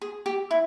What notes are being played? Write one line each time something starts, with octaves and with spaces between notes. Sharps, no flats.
G#4
G4
E4